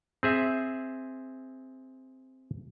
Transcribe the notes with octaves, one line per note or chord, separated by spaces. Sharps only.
C4 G#4 E5